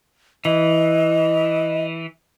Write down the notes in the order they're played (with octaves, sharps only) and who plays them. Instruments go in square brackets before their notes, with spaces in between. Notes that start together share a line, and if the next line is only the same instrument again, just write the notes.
[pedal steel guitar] E3 [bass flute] D#5